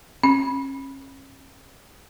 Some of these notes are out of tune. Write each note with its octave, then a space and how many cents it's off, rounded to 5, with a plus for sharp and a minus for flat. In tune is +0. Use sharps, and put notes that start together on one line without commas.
C#4 -35